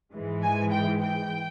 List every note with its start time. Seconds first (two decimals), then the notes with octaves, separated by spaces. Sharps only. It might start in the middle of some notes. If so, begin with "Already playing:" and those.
0.13 G#2 E3 G#3
0.43 G#5
0.71 G5
1.00 G5